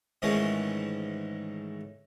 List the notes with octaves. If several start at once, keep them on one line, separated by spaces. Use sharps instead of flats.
G#2 D#3 E3 G#3 A3 C#4